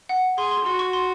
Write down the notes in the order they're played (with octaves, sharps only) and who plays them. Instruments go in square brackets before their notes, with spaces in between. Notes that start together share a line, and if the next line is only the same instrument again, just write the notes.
[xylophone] F#5
[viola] G#4 [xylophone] C6
[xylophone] C6
[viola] F#4 [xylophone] C6
[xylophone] C#6
C6